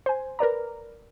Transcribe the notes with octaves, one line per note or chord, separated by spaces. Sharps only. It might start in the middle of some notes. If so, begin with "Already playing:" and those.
C5 G#5
A#4 B4 D5 A#5